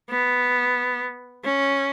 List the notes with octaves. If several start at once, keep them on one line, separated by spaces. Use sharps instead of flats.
B3
C#4